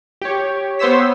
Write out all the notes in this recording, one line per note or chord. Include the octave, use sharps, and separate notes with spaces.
G4 C#5
B3 C5 C#5 E6 B6